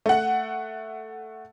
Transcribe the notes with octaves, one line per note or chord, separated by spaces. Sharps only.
A3 F#5